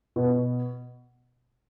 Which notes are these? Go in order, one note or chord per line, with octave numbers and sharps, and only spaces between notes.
B2